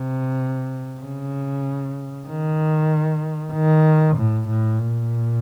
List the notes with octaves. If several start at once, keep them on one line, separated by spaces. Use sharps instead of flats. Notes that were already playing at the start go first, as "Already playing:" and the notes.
Already playing: C3
C#3
D#3
D#3
A2
A2
A#2